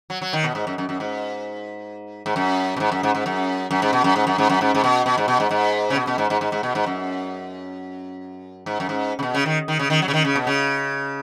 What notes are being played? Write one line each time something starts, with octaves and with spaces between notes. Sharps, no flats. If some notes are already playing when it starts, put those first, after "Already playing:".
F#3
F#3
D#3
B2
G#2
F#2
F#2
F#2
G#2
G#2
F#2
B2
G#2
F#2
G#2
G#2
F#2
F#2
G#2
B2
F#2
G#2
F#2
G#2
F#2
G#2
G#2
B2
B2
G#2
B2
G#2
G#2
C#3
B2
B2
G#2
G#2
G#2
G#2
B2
G#2
F#2
G#2
F#2
G#2
C#3
B2
C#3
D#3
D#3
C#3
D#3
F#3
C#3
D#3
C#3
B2
C#3